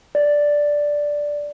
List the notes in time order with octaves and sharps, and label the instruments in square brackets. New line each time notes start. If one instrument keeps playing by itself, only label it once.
[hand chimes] D5